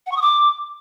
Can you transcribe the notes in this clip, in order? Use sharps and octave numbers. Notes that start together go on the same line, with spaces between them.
F#5
C#6
D#6
D6